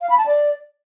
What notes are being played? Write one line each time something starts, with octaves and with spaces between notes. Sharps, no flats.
F5
B5
A5
D5